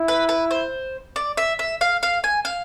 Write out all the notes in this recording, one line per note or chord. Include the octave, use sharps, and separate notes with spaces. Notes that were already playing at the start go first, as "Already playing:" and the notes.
Already playing: E4
B4
B4
C5
D5
E5
E5
F5
F5
G#5
F5